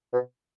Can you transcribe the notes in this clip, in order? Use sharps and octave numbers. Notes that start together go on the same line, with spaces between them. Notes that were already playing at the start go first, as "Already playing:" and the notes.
B2